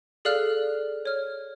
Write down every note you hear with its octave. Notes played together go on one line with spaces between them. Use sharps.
G#4 A4 D5 F5 F6 F#6
C#5 F6